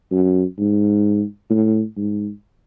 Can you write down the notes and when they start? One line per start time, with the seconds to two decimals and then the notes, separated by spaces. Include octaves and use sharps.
0.12 F#2
0.58 G#2
1.50 A2
1.96 G#2